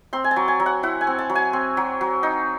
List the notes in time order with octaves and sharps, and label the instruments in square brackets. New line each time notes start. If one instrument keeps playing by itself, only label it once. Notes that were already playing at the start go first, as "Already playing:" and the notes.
[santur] C4 C6
G#5
A5
F#3
G#5
F#3
F#5
E4 F#5
G#5
C4
A5
F#3
G#5
C4
F#3
F#3
D#4